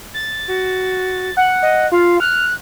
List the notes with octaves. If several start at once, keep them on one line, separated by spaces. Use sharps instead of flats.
A6
F#4
F#5
D#5
F4 F5
F6 F#6